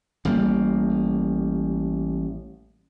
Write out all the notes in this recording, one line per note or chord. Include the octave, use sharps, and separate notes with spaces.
A1 G3 A#3